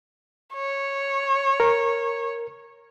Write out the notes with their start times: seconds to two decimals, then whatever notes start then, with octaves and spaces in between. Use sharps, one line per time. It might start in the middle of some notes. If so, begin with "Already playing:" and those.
0.54 C#5
1.60 A#4